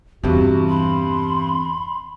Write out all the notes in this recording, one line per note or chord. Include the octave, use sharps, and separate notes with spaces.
E2 G2 C3 E3 F#4
B5 C6